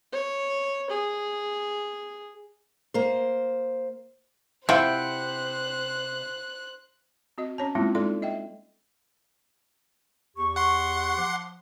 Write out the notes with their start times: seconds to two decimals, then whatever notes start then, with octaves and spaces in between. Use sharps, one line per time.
0.13 C#5
0.90 G#4
2.94 A#3 C5
4.69 C3 C4 E4 F4 C5 F#5 G5 F#6
7.38 C4 F#4 D#5
7.58 C#4 C#5 A5
7.75 G3 G#3 A#3 C4 E4 F4
7.95 G#3 D#4 F4 A4 D5 C6
8.22 D#5 E5 G5
10.36 E2 G4 C#6
10.56 F#5 C6
11.17 F3 D6